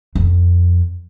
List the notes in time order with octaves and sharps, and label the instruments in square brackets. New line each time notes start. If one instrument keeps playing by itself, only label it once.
[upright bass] F2